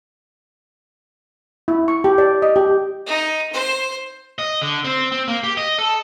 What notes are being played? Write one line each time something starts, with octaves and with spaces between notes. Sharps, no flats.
E4
C#6
G4
D5
D#5
G4
D#4
C5
D#5
D3
C4
C4
A#3
G4
D#5
A4